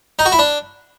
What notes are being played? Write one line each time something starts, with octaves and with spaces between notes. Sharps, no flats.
D#4
F#4
E4
D4